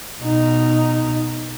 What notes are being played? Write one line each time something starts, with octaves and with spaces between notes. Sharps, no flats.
B2 D#4